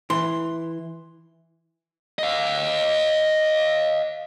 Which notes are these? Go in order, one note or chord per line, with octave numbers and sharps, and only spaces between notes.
E3 C6
D#5 F5